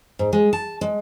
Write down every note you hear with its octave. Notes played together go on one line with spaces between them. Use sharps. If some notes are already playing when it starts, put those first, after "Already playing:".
G#2
G#3
A5
G#3